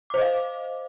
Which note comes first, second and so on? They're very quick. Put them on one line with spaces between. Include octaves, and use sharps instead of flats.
D6 C5 D#5 F5